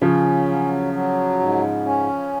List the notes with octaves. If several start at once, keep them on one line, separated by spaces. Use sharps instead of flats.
C#3 F3 C#4
F#3
F#3
G#2
C#4